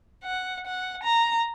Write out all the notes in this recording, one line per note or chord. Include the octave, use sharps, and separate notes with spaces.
F#5
F#5
A#5